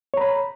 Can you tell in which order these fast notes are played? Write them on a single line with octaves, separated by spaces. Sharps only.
C#5 A#5 B5